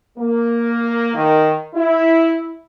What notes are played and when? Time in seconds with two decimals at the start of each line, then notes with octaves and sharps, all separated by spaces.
0.18 A#3
1.14 D#3
1.75 E4